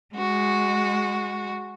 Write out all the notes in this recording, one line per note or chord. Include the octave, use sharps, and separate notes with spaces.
G#3 F#4